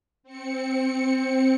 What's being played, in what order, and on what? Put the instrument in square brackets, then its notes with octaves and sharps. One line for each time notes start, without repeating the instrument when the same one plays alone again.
[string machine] C4 C#7